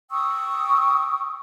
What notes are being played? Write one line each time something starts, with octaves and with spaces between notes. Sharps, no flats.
G5 C#6 D#6 E6